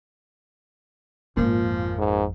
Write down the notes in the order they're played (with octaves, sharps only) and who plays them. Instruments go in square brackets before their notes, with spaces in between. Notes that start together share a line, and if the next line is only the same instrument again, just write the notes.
[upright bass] G#1 F2 [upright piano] A#2 [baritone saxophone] F3
[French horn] G#2